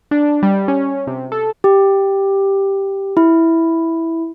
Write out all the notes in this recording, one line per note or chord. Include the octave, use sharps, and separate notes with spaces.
D4
G3
C#4
C3
A4
G4
E4